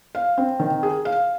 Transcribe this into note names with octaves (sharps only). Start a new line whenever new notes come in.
F5
C4
D#3
G#4
F5